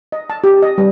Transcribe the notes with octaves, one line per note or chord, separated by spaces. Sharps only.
D#5
A5
G4
D#5
G3